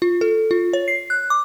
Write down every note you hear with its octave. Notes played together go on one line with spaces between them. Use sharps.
F4
A4
F4
C#5
C7
F#6
D6